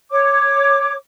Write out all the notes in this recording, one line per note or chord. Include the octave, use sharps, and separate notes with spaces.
C#5 D6